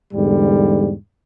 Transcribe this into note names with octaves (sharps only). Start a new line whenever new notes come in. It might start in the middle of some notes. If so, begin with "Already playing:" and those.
E2 G#2 D3 G3